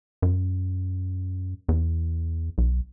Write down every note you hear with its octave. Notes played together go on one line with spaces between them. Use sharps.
F#2
E2
B1